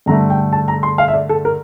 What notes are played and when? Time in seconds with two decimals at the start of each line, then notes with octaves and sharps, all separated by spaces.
0.06 G2 D3 A3 A#5
0.30 G5
0.53 A5
0.68 A#5
0.83 C6
0.98 F5
1.08 E5
1.14 D5
1.29 A4
1.45 A#4